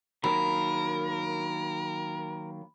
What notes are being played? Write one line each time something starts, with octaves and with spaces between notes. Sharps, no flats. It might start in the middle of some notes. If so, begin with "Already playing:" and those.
D#3 F#3 A#3 A#4 B5